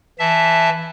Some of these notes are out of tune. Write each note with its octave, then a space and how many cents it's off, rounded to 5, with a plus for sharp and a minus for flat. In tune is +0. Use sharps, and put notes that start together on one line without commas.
E3 +0 E5 +0 A5 -10